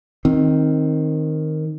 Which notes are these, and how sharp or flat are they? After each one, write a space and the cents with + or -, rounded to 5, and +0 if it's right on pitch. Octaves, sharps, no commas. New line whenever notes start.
D#3 +0 C4 +15